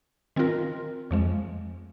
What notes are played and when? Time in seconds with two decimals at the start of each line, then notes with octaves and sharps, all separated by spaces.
0.36 D#3 C4 F4 A#4
1.11 F2 F3 G#3